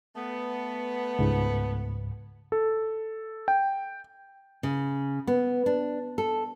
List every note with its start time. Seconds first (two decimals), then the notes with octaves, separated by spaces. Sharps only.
0.16 A3 B3
1.19 C#2 G#2
2.52 A4
3.48 G5
4.63 C#3
5.27 B3
5.66 D4
6.18 A4